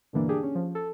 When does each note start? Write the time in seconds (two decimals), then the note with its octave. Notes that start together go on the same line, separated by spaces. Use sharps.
0.13 G2 B2 D3 E3 A#3 D4
0.29 D4 G4 G#4
0.43 C#4
0.55 F3
0.75 A4